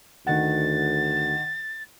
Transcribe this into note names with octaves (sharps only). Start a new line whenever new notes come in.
D2 D#3 F#5 A6